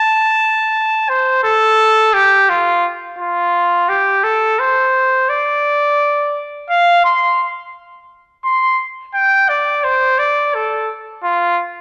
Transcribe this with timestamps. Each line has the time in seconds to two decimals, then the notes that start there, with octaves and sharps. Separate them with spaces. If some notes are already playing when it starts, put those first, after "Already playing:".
Already playing: A5
1.09 C5
1.44 A4
2.14 G4
2.49 F4
3.19 F4
3.89 G4
4.24 A4
4.59 C5
5.29 D5
6.69 F5
7.04 C6
8.44 C6
9.14 G5
9.49 D5
9.84 C5
10.19 D5
10.55 A4
11.24 F4